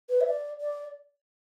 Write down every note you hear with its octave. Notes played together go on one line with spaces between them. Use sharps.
B4
E5
D5
D5